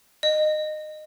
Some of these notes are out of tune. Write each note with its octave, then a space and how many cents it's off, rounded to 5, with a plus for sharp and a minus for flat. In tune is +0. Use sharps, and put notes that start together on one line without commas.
D#5 -20